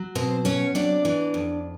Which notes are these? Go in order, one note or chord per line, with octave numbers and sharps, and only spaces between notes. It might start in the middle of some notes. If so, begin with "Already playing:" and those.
Already playing: F#3
B2 C4 C5
F#3 C#4 C#5
C3 D4 D5
E3
F2